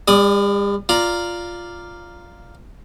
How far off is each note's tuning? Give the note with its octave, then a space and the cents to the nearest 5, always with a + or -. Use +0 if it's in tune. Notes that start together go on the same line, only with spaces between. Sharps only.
G3 +45 D5 +0 D#6 +0
F4 +0 D5 +0 A#5 +0